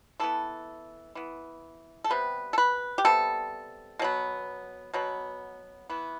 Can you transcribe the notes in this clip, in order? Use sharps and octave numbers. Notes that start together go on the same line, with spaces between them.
E3 B3 A4
E3 B3
A4
C3 G3 B3 B4
A4
B4
G4
C3 G3 B3 A4
B2 F#3 B3
B2 F#3 B3
E3 B3